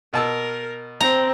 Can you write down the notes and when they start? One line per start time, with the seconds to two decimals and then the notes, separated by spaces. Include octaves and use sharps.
0.14 B2 A#4 A5 E6
1.01 C4 A#5